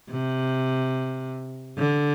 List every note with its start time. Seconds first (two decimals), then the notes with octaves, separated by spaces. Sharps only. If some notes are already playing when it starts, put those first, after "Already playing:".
0.11 C3
1.78 D3